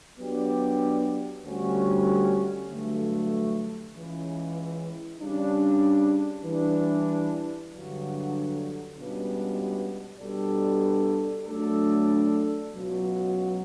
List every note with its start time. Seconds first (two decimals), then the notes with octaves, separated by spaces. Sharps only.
0.20 F#3 B3 D4 G4 D5
1.44 D2 D3 G3 C#4 F#4
2.69 G2 D3 F#3 A3
3.94 C#2 C#3 E3
5.20 C#3 G3 D4
6.45 E3 G3 D4
7.69 G2 D3 F#3
8.95 C#2 B2 G3 B3 D4
10.20 B2 G3 D4 A4 D5
11.46 F#3 A3 D4 A4 D5
12.70 C#2 B2 F#3